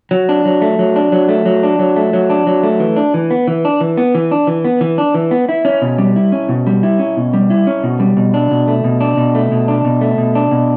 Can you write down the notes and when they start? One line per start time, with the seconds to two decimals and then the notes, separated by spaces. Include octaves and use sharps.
0.11 F#3
0.29 D4
0.45 F#3
0.62 A3
0.79 F#3
0.96 D4
1.12 F#3
1.29 A3
1.46 F#3
1.63 D4
1.79 F#3
1.96 A3
2.13 F#3
2.30 D4
2.47 F#3
2.63 A3
2.80 E3
2.96 D4
3.14 E3
3.30 B3
3.48 E3
3.65 D4
3.81 E3
3.98 B3
4.15 E3
4.31 D4
4.47 E3
4.65 B3
4.81 E3
4.98 D4
5.14 E3
5.31 B3
5.49 E4
5.65 C#4
5.82 B2
5.98 G3
6.16 E4
6.32 C#4
6.49 B2
6.67 G3
6.83 E4
6.99 C#4
7.17 B2
7.34 G3
7.50 E4
7.67 C#4
7.83 B2
8.00 G3
8.17 B2
8.34 D4
8.51 B2
8.67 A3
8.84 B2
9.01 D4
9.17 B2
9.35 A3
9.52 B2
9.68 D4
9.85 B2
10.01 A3
10.18 B2
10.35 D4
10.51 B2